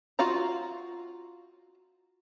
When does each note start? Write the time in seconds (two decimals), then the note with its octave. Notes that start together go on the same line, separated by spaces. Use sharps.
0.19 F4 F#4 F5 A#5